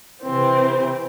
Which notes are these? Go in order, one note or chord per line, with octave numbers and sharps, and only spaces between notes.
C3 E3 C4